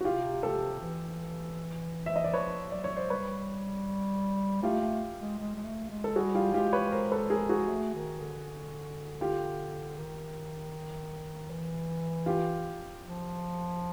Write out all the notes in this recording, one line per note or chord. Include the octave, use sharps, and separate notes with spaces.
F#4
C3 F4 G4
G4 A4
E3
E5
D#5
D5
F3 B4 C#5
F#3 D5
C#5
C5 D5
G3 B4 C#5
A3 F4 G4
A3
G#3
G#3
G#3
A3
G#3
A4
G3 F#4 G#4
F4 G4
G#3 F4 G4
B4 C#5
A#4 C5
A4 B4
G#4 A#4
F#4 G#4
A3
D#3
D3
F4 G4
D#3
E3
F4 G4
F3